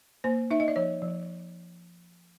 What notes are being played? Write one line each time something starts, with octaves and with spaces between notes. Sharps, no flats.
A#3 C5
D#4 E5
D#5
D5
F3 C#5
F3